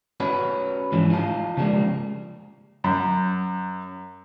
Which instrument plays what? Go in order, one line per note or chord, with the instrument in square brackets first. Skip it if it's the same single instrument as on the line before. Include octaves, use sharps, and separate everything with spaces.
[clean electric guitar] C#4 F#4 B4
G#2 E3 F3
D#4 F4 F5 A5
C#3 E3 F3 G3 G#3 A#3
[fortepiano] F#2